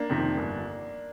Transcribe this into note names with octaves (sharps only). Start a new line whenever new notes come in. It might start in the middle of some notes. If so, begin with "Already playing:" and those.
Already playing: A#3 D4
F2 C3 D#3
G1